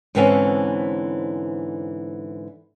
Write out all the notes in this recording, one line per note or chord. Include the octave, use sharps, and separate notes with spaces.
G#2 D3 E3 C4 C#4 A4